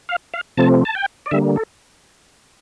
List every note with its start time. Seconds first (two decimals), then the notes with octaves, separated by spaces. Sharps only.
0.09 F5
0.34 F5
0.57 C3 F3 A3 C4 A5
0.85 A5
0.95 G5
1.26 D5
1.31 D3 G3 A#3 E5
1.56 A4